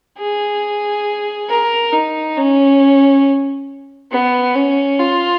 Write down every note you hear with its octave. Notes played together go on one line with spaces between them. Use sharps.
G#4
A#4
D#4
C#4
B3
C#4
F4